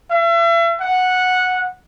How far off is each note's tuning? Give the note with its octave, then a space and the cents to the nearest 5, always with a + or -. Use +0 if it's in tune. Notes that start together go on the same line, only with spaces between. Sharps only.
E5 +40
F#5 -10